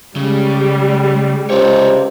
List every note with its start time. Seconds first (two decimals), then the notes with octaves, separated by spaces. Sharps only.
0.16 C#3 G3 G#3
1.50 C#2 C3 C#5 D5